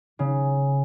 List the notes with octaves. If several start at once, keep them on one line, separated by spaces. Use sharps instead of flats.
C#3